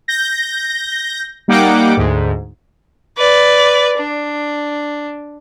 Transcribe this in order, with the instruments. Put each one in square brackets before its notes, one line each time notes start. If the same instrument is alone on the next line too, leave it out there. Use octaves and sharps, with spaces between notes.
[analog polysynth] G6 A#6
G3 A#3 D#4 F#5 G5 D6
D2 G#2
[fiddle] B4 D5
D4